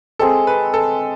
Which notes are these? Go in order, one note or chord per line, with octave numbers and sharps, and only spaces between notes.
G#3 C4 G#4 A4
B4
A4